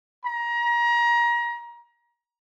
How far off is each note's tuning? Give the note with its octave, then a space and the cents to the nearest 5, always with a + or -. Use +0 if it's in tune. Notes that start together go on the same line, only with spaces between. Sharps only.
A#5 +30